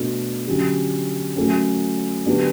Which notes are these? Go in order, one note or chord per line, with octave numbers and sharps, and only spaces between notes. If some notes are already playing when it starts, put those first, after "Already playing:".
Already playing: B2 A3 D4 F#4
D3 F#3 C#4 G4
F#3 A3 C#4
D3 F#3 B3 D4 G4